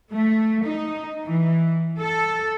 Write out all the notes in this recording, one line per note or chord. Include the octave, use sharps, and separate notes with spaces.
A3
D#4
E3
A4